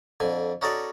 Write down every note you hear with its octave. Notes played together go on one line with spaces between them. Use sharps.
F2 D3 G#5
C#4 D#4 F#4 A4 C#5 D5